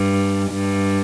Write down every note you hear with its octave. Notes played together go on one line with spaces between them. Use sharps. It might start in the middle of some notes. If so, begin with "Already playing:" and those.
Already playing: G2
G2